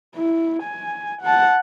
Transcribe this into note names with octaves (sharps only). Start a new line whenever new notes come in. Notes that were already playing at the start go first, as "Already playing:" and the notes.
E4
G#5
F#5 A5